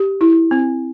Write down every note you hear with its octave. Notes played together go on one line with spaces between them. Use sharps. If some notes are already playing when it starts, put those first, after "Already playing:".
Already playing: G4
E4
C4